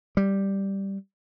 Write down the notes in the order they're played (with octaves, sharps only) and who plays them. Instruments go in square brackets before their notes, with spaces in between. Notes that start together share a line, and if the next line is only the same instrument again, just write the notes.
[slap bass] G3